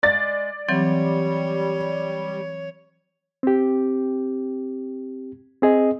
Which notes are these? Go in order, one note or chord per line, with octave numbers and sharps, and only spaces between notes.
G#3 D5 A6
E3 F#3 G3 C4 C#5
C4 G4
C4 G#4 D#5